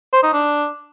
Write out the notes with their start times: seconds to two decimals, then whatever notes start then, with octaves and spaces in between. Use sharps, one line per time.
0.13 C5
0.23 D#4
0.33 D4